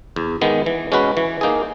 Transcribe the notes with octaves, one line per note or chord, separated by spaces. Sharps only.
E2
D#3 G#3 B3
E3
G#3 C#4 F#4 B4
E3
A#3 D#4 G#4